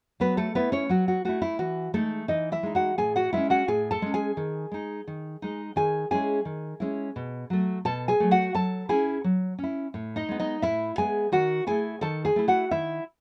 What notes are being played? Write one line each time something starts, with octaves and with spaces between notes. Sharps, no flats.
F#3 B3 B4
A3 A4
A3 B3 E4 B4
C#4 C#5
F#3 F#4
F#4
A3 E4 F#4
E4
E3 F#4
G#3 A3 D#4 A4
E3 D#4 D#5
E4 E5
G#3 D#4
F#4 F#5
A2 G#4 G#5
F#4 F#5
G#3 C#4 E4 E5
F#4 F#5
A2 G#4 G#5
A4 A5
G#3 C#4
G#4 G#5
D#3
G#3 D#4
D#3
G#3 D#4
D#3 G#4 G#5
G#3 C#4 E4 G#4 G#5
D#3
G#3 C#4 E4
B2
F#3 A3
B2 A4 A5
G#4 G#5
F#3 A3
F#4 F#5
F#3 A4 A5
C#4 E4 G#4 G#5
F#3
C#4 E4
A2
D#4 D#5
G#3 B3
D#4 D#5
A2 E4 E5
G#3 B3 G#4 G#5
D#3 F#4 F#5
A3 E4 G#4 G#5
D#3 A4 A5
G#4 G#5
A3 E4
F#4 F#5
D#3 E4 E5